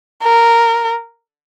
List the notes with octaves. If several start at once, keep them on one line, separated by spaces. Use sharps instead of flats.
A#4